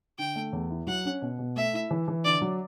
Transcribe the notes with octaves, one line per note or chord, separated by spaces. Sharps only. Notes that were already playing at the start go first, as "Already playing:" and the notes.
D3 G5
A3
E2
E4
F#3 F#5
C#4
B2
B2
A3 E5
E4
E3
E3
D3 D5
F#3